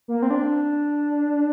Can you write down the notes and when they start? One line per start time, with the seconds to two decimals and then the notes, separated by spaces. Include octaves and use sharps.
0.08 A#3
0.22 C4
0.30 D4